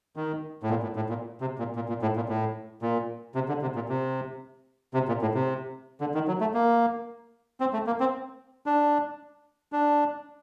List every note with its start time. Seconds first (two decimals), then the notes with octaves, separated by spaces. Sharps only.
0.16 D#3
0.63 A2
0.70 A#2
0.83 A2
0.96 A2
1.09 A#2
1.41 C3
1.58 A#2
1.75 A#2
1.89 A#2
2.02 A2
2.16 A#2
2.29 A2
2.82 A#2
3.35 C3
3.48 D3
3.62 C3
3.75 A#2
3.89 C3
4.94 C3
5.08 A#2
5.22 A2
5.34 C3
6.00 D3
6.14 D#3
6.28 F#3
6.41 A3
6.54 A#3
7.60 C4
7.73 A3
7.87 A#3
8.00 C4
8.66 D4
9.72 D4